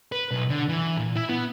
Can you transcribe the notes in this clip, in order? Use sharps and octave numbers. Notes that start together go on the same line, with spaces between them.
B4
B1
D3
E3
A#2
E4
B3